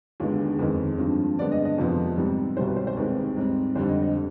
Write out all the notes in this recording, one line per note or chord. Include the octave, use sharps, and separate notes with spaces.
D#2 D3 G#3 B3 F4
G#4
F2 D#3 G#3 B4
G2 F3 C4
G2 D3 G#3 B3 D5
D#5
D#5
F2 C3 F3 B3 C5
G#2 G3 C4
C2 B2 G3 C4 C5
B4
C5
C5
D#2 D#3 G#3 C4 B4
G#2 G3 C4
F2 D3 G3 C5
D#5
D#5